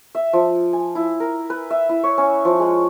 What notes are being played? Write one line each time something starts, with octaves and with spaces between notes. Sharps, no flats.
E5
F3
G#5
E4
A#4
B4
E5
E4
C#5
C#4
F3
G#3